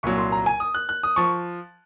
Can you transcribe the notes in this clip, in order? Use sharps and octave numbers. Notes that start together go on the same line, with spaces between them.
C2 A#2 F#3 C#6
C6
A#5
G#5
D#6
F#6
F#6
D#6
F3 C#6